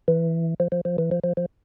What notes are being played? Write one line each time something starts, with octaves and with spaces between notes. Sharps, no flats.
E3
F3
F3
F3
E3
F3
F3
F3